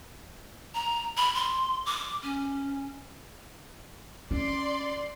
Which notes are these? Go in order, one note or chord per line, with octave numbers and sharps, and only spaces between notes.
A#5
B5
C6
D6
C#4
C#4 D5 C6